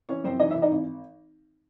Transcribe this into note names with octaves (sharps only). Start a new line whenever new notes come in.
E3 C#4 C#5
F#2 C4 C5
E3 D#4 D#5
E4 E5
E3
D#4 D#5
G#1